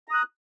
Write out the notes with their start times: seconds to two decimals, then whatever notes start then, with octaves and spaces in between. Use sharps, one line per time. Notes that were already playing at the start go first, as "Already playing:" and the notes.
0.08 A#5
0.11 D#6
0.14 F#6